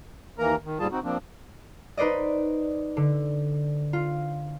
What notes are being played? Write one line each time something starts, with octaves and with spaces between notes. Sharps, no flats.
D#2 E3 A#3 A#4 A#5
D#3
D#2 G#2 G3 F4 G#4 A5
C4 D#4 F#4
F3 A#3 C4 D4
D#4 B4 C5 D5 D#5
D3
F4